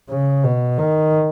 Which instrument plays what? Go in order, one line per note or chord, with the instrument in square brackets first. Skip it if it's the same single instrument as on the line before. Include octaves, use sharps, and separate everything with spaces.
[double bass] C#3
B2
D#3